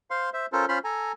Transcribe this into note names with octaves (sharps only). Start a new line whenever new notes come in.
C5 F5 C6
C5 E5
C#4 F4 A4 A#4 C5
C#4 F4 C5 B5 C6 F6
A4 G#5 A#5